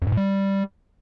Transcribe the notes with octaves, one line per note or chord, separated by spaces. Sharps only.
F2
G#2
A2
G3